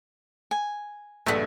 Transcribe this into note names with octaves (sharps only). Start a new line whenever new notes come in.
G#5
A#1 G2 C#3 A3 D#5 F#5 B6